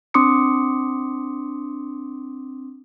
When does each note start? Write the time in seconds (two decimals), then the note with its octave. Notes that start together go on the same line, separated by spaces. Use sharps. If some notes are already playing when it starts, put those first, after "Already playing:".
0.14 C4 D4 C6 D6 D#6 C#7